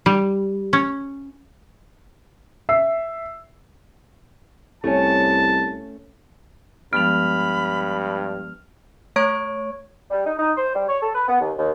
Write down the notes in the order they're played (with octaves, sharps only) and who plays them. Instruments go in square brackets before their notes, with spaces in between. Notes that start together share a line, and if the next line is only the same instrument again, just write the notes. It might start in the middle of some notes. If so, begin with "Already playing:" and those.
[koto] G3
C#4
[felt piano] E5 E6 C7
[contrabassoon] C2 [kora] A3 C#4 [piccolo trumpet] A5
[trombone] G2 [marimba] F3 G#3 B3 [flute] B5 [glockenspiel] F6 F7
[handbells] A3 C#5 C#6 G#6 D7
[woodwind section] G3
D#4
D#4
C5
G3
C#5
A4
B4
B3
D#2
D#2